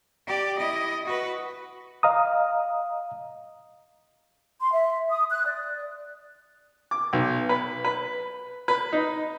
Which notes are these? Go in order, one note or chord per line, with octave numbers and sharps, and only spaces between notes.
G4 D5
E4 D#5
F#4 B4
D#5 F5 A#5 D#6
C6
E5
D#6
F#6
D5
D6
B1
B4
B4
B4
D#4